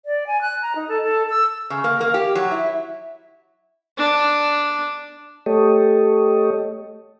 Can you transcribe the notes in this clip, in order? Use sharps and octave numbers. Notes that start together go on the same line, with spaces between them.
D5
G#5
F#6
A#5
D#4
A4
A4
E6
C#3
A#3
A#3
G4
F#3
E4
D4
A3 G4 A4 C#5 D#5